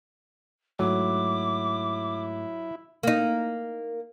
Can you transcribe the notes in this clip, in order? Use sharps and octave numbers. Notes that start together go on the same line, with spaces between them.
G#2 F#3 A3 E4 D6
A#3 D#4